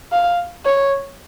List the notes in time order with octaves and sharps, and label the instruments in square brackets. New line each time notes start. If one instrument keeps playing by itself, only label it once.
[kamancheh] F5
C#5